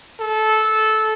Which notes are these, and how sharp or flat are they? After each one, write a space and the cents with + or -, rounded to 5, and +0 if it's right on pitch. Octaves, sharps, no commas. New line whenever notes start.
A4 -15